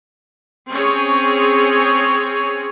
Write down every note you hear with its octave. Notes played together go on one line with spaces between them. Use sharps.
C4 C#4 G#4 C#5